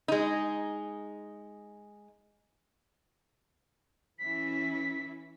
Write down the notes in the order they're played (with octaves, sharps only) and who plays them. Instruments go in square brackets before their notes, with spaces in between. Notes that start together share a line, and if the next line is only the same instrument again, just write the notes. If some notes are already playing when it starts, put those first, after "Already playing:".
[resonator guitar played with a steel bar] G#3 D#4
[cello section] E3 C#4 E4 [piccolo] B6